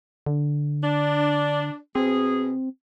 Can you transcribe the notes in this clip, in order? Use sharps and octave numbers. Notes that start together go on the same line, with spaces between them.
D3
D4
B2 C4 G#4